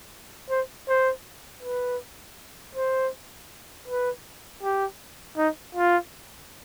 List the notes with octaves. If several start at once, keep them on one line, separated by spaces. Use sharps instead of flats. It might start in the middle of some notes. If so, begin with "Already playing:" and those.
C5
C5
B4
C5
B4
G4
D#4
F4